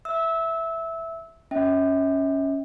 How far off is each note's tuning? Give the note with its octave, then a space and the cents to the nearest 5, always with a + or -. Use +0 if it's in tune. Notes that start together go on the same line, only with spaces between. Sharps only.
E5 +0 E6 -20
C#4 +0 E5 -40 G5 +0